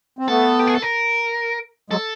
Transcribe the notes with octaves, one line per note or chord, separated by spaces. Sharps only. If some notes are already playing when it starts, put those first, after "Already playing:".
C4
A3 B3 A4
G4
G#4
A4
A#4
F#3 G#3 A4